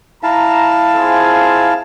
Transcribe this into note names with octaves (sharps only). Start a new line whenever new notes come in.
E4 F5 A5 A#5
C4 F4 G#4